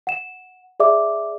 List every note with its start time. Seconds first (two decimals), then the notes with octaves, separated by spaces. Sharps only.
0.07 F#5 E7
0.80 G#4 D5 E5 D6